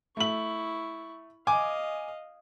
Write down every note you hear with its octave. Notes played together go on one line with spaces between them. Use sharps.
A3 E4 C#6 F#7
D#5 F5 G#5 D6